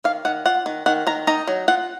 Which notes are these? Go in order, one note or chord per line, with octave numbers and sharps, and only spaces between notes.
D#3 F5
D#3 F#5
F4 F#5
D#3
D#3 F#5
D#3 A#5
D#4 A#5
F#3
F4 F#5